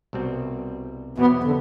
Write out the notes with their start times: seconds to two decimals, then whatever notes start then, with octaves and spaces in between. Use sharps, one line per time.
0.13 C2 B2 G3 C4 F#4
1.17 E2 B2 F#3 B3 C4 G4
1.44 D3